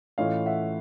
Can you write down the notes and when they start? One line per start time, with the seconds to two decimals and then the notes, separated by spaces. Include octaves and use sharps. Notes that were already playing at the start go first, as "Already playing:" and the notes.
0.18 A2 E3 A3 C#4 F4 D#5 F5
0.46 E5 F#5